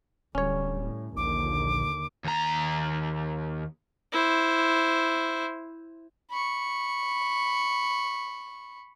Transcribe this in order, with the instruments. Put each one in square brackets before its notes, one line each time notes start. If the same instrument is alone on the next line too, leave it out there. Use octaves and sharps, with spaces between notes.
[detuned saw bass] D1 [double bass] D3 G3 [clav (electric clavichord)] C#4 C#5
[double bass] A2
[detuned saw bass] A#1 [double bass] D#2 D3 [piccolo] D6
[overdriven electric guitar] D#2 A#5
[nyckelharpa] E4 C5
[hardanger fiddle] B5 C#6